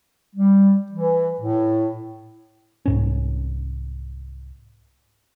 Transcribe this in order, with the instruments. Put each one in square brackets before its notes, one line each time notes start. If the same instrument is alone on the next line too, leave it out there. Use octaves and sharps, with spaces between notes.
[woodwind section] G3
E3
A2
[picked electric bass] C2 G#2 C#4